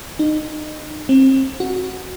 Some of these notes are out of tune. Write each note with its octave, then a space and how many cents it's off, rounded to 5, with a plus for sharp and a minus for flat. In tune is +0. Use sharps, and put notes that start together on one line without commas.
D#4 -25
C4 +30
F#4 -5